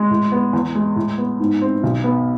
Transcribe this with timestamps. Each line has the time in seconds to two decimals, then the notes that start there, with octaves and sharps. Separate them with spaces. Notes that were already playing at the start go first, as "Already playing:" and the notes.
Already playing: G#3
0.10 A2
0.32 B3
0.53 E2
0.75 G#3
0.96 A2
1.18 B3
1.40 G#2
1.62 C4
1.83 B1
2.04 B3